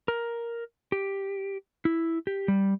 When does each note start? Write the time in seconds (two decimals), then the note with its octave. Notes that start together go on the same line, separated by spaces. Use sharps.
0.08 A#4
0.92 G4
1.85 E4
2.27 G4
2.48 G3